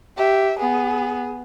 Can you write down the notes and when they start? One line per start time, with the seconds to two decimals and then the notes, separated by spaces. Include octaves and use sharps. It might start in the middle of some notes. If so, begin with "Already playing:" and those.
0.17 G4 E5
0.59 B3 G#4